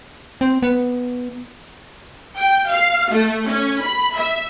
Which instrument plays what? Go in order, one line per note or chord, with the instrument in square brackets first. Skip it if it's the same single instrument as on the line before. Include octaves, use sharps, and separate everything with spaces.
[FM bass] C4
B3
[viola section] G5
F5
A3
C#4
B5
E5